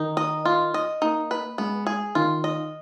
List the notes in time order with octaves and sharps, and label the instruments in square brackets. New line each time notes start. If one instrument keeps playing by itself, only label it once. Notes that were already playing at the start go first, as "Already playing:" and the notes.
Already playing: [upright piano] D#3 [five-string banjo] D#4
[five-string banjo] D#5
F4
D#5
[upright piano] A#3 [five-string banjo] D#4
[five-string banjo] B4
[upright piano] G#3 [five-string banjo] B3
[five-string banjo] G#4
[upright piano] D#3 [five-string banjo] F4
[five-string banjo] D#5